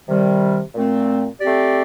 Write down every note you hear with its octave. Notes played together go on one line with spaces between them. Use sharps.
C3 D#3 G3
A#2 A3 C4
A3 C4 G4 D5